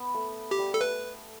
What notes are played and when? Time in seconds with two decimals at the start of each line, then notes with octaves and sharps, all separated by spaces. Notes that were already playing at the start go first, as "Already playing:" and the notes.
Already playing: B3
0.14 A3
0.51 G4
0.58 G3
0.74 A4
0.81 A3 B4